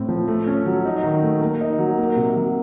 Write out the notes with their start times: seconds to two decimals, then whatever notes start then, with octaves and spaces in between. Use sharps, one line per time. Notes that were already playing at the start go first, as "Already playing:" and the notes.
Already playing: A2 C4
0.09 F3
0.28 A3
0.46 C#4
0.66 F#3
0.85 D#4
1.04 D#3
1.23 A3
1.41 A#3
1.61 D#4
1.79 F#3
1.98 A#3
2.16 C3
2.36 F#3